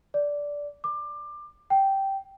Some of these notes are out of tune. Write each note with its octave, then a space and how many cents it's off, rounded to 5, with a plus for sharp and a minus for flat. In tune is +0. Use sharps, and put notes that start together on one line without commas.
D5 -10
D6 +25
G5 -10